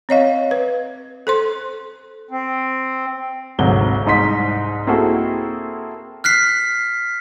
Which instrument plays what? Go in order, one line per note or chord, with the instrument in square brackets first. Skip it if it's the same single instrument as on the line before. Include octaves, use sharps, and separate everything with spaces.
[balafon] C4 C#5 D#5 F5
B4
A4 C5 C6
[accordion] C4
[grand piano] G#1 D2 G#2 C3 F#3 G7
C2 G#2 D#4 D#5 C6 B6
A#3 C4 E4 F#4 G#4 A4
[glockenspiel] F6 F#6 B6 C7